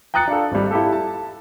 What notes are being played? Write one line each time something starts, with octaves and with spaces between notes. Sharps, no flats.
G5 A#5 D#6 F#6 A6 C#7
D4 F4 A4
G#1 G3
E4 F4 G4 A4
A5